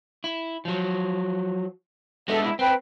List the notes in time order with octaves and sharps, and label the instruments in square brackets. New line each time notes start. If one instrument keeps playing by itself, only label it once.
[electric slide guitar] E4
F3 F#3
[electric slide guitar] G#3 B3 D4 [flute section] A4 E5
[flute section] E4
[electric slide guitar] C4 [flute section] B4 G5